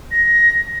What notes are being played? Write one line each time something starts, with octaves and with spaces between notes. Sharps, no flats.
A#6